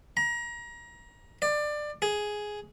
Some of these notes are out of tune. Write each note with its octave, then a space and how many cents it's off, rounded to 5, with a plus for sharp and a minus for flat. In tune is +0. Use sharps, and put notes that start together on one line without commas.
A#5 +30
D5 +20
G#4 +5